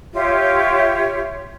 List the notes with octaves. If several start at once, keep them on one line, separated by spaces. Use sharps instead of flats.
F4 G4 C#5 E5